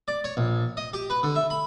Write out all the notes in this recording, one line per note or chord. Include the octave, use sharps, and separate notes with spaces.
D5
C#5
A#1
D#5
G4
B4
D3
E5
B5